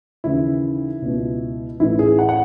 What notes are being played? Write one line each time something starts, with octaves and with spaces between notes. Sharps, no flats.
D#2 C#3 E3 E4
C#2 B2
A1 A2 E3 E4
G#4
F#5
F#5